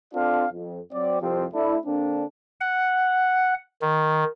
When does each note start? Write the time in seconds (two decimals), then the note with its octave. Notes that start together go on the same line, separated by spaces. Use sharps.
0.14 C4 D4 F4 A4 D5 F5
0.53 F2
0.93 F#3 C4 D5
1.21 C2 F2 F3 C4 G4
1.54 A3 D4 E4
1.86 D3 A#3 C4 D4
2.61 F#5
3.82 D#3